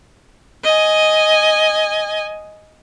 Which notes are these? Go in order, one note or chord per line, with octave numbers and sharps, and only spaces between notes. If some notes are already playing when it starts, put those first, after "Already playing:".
D#5 G#5